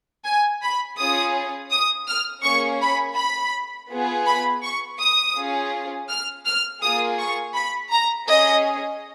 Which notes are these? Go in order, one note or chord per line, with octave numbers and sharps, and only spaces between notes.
G#5
B5
C#4 F4 G#4 D#6
D#6
F6
A#3 C#4 G#4 C#6
B5
B5
B3 F4 G#4
B5
C#6
D#6
C#4 F4 G#4
F6
F6
A#3 F4 G#4 D#6
C#6
B5
A#5
C#4 G#4 D#5